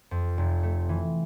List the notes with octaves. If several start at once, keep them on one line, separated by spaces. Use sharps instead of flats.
F2
F1
A3
E3